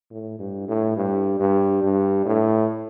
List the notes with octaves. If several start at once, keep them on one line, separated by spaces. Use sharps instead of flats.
A2
G2
A2
G2
G2
G2
A2